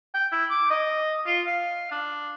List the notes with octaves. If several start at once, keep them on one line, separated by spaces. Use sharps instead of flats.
G5
E4
D6
D#5
F4
F5
D4